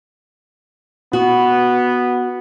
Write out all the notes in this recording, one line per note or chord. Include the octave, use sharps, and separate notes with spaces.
B3 F#4